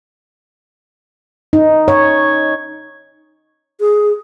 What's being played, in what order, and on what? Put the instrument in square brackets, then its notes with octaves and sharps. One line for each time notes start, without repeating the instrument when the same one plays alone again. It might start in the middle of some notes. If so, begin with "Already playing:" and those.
[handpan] D#4
C#5
[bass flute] G#4